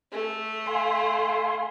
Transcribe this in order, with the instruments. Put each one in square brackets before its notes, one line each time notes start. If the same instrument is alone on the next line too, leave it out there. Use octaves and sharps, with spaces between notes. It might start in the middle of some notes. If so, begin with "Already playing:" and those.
[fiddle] A3
[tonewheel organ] F5 G#5 C6